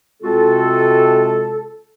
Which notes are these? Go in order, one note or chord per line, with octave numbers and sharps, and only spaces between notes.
C3 G#3 C4 F4 F#4 A4